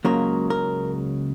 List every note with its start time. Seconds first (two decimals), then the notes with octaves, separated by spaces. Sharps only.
0.05 C#2 C#3 F#3 A#3 A#4
0.50 A#4